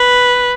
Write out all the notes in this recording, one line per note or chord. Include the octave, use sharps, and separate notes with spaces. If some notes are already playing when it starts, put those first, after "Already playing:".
Already playing: B4